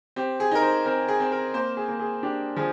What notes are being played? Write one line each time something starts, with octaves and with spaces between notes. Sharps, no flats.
C4 G4
G#4
D#4 A#4
C5
C4 A#4
G#4
C4
A#4
A#3 C5
G#4
A#3
G#4
D4 G4
F3 G#4